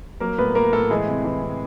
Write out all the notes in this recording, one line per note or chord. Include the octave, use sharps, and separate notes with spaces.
F#3 A#3 A#4
A2 B3 B4
A#3 A#4
A2 A3 A4
E3 G#3 G#4
C3
E3
C3